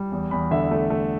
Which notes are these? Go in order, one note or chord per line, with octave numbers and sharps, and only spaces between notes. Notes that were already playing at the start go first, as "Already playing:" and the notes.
Already playing: G3
E2
E2 B5
D3 E5
A3
A3